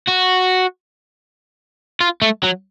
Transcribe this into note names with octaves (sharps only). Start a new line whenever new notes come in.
F#4
F4
A3
F#3